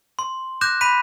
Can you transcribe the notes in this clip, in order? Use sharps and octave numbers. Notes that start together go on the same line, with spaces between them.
C6
D6 F#6 G6 A#6 E7
B5 B6 D#7